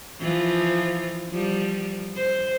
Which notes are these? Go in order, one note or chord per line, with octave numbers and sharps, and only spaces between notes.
E3 F3 F4
F3 G3
C5